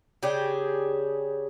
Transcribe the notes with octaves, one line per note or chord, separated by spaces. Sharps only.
C#3 D4 G4 G#4